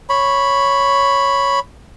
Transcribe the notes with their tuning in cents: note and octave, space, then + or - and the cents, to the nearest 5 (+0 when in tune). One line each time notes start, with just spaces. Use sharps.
C#5 +0 B5 +0